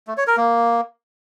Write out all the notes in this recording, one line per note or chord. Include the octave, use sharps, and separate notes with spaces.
A3
C#5
A#4
A#3